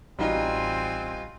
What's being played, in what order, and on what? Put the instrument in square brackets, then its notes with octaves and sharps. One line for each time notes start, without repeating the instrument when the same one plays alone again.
[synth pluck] A1 [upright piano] G3 D#4 F#4 [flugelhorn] C4 [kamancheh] F4 G#5